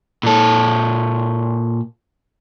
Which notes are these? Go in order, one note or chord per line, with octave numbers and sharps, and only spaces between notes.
A#2 A4